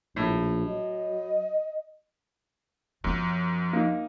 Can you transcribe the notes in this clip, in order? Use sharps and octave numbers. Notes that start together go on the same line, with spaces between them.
A#1 A2
F#3 D#5
F#2 F3 B3
A#3 D#4